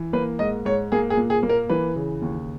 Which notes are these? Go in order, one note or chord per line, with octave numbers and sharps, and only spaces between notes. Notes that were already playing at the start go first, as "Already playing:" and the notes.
Already playing: E3
A#3 B4
G#2 D#5
G#2 C#5
A#3 G#4
G#4
A#2
G#4
A#3
A#4
E3 B4
C#3
D#2